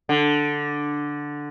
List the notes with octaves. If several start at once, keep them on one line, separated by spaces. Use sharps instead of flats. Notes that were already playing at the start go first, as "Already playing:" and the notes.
D3